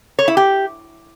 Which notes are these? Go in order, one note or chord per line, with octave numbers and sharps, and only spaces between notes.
C#5
E4
G4